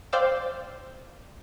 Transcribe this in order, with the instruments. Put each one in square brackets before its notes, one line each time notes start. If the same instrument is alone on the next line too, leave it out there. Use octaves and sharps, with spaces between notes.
[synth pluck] C5 D5 F5 G5 D6 E6